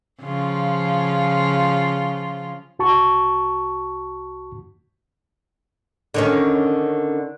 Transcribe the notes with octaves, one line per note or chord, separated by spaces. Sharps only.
C#3 F3 F4
C2 F#4 A5 C#6
D3 D#3 C#4